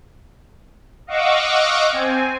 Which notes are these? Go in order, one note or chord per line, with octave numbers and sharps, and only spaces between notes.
D#5 F5 F#5 C#6 D6 E6
C4 G#5